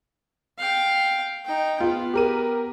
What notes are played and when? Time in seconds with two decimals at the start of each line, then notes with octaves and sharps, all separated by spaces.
0.58 F5 G5
1.45 D#4 G5
1.80 B3 F4
2.14 G4 A#4 D#7